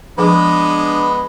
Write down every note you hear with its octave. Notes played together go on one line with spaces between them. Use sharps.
F3 G#3 B3 D4 G#4 B4